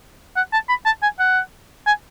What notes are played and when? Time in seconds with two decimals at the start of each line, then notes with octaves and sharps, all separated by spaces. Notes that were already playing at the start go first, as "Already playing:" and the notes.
0.36 F#5
0.53 A5
0.69 B5
0.86 A5
1.03 G#5
1.19 F#5
1.87 G#5